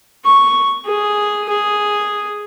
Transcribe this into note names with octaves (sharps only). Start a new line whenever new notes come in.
C#6
G#4
G#4